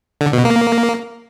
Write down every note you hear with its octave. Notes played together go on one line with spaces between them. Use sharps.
D3
B2
A#3